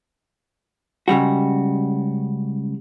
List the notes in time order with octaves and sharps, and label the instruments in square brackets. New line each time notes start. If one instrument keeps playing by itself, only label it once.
[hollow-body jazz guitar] C#2 C#3 G3 F#4